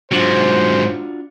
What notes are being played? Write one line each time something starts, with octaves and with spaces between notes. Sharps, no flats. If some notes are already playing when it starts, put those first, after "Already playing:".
G#2 F#3 D4 F4 F#4 C5